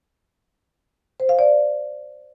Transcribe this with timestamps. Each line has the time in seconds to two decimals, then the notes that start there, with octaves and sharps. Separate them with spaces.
1.20 C5
1.29 F5
1.39 D5